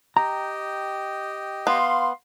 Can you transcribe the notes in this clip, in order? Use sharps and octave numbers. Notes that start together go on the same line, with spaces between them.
G4 D#5 G5 A#5
B3 F5 C6